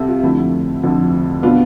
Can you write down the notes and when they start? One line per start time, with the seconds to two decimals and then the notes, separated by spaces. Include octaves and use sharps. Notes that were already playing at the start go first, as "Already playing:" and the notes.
Already playing: C2 C3 G4 A4
0.08 F4
0.23 F2 D3 F3 A3 E4
0.83 F2 D3 F3 A3
1.43 B2 B3 D4 F4